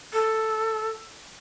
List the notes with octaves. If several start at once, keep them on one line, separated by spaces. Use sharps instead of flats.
A4